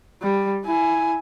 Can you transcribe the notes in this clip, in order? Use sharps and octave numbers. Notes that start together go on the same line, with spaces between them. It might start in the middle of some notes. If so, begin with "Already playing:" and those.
G3
E4 G#5